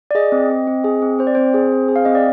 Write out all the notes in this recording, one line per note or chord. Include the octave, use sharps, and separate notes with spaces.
D5
G#4 D#5
C4
C4
C4
G#4
C4
C4 C5
D5
C4 C5
G#4
C4
G#4
F5
C4 D#5
D5